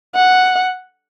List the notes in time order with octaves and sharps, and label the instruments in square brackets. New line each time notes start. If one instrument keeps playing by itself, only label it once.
[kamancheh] F#5